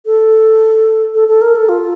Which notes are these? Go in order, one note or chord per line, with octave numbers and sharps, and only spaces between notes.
A4
A4
A4
A#4
A4
F4